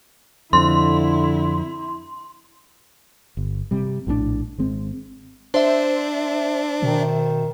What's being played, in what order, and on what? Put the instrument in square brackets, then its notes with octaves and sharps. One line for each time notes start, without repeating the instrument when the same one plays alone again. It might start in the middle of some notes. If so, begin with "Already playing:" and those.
[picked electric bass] F2 [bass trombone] D3 [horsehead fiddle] E4 [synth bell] C6
[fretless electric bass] G1
C3 G3
A#1 A2 C3 D4
G#1 G#3 C4
[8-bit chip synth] D4 [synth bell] C5 E5
[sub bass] B2 [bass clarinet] D#3